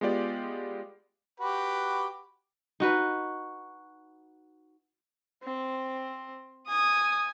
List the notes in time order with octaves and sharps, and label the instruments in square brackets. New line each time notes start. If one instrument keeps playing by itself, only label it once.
[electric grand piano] G#3 B3 F4 G4 D5
[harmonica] F#4 G4 B4
[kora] D#4 F#4 B4
[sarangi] C4
[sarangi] G#5 [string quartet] D#6